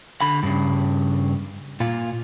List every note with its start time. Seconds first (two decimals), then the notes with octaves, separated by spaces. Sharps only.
0.21 D3 B5
0.43 G2 C#3
1.80 A#2 F4